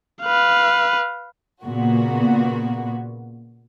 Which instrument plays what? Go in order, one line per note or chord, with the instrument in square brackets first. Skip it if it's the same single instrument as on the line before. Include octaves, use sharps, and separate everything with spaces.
[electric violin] B4 F5
[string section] A#2 C#3 A#3 B3 F#4